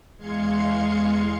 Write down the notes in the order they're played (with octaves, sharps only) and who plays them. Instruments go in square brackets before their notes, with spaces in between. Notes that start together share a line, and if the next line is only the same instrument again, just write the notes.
[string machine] E2 G#3 F5 C6 G#6 C#7